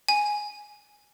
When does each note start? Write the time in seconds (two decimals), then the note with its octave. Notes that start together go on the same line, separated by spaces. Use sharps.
0.09 G#5